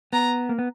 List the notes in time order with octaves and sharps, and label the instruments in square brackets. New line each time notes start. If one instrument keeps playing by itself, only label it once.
[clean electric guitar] B3 [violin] A#5
[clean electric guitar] A#3
B3